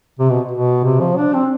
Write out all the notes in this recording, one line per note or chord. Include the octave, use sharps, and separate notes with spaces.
C3
B2
B2
C3
F3
D4
C4